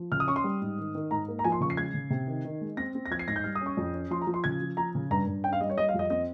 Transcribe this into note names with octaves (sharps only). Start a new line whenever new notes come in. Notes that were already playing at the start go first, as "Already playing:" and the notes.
Already playing: F3
C#3 F6
D#6
C#4 C#6
C6
G3
G#2
D#3
D#3
G#2 A#5
A#3
A#5
F3 G#5
C6
C#3 C#6
C7
G#3 G#6
C#3
C3
D#3
D#3
G#3
C4 A#6
C4
A#6
F3 G#6
C7
G#2 A#6
G6
G3 F6
D#6
C#4
C#6
F2
C#4
F3 C6
A#5
F3
C6
C#3 G#6
F3
F3 A#5
C#3
G2 A#5
G2
C#4 G5
F5
G3 D#5
C#5
G3 D#5
F5
F2
D#5
C4 D#5